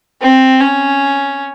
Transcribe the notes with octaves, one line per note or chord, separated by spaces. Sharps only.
C4
C#4